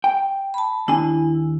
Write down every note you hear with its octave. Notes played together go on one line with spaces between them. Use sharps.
G5
A5 B5
D#2 D4 E4 G#5